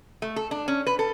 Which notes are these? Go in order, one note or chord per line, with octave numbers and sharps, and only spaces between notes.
A3
A4
D4
C#4
B4
A4